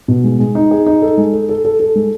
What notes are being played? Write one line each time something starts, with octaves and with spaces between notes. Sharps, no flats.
B2
G#3
G#3
D#4
G#4
D#4
A4
G#3
A4
A4
A4
A4
G#3